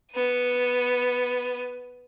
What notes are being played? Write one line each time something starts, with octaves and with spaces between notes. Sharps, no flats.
B3 D#7